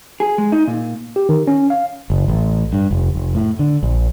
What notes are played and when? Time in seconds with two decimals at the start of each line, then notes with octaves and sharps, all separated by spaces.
0.20 G#4
0.38 G#3
0.52 D#4
0.68 A#2
1.16 G4
1.29 D#3
1.47 C#4
1.70 F5
2.10 F#1
2.28 A1
2.73 G2
2.91 F1
3.15 F1
3.35 A2
3.59 D3
3.83 A#1